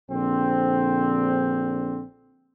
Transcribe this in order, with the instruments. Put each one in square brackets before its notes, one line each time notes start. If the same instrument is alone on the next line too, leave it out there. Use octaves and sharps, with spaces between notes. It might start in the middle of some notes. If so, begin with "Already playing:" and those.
[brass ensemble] A#1 D3 C4